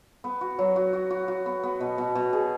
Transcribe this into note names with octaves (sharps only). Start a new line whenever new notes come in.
B3
F#4
F#3
F#4
F#4
F#4
F#4
B3
B3
B2
B2
B2
G#4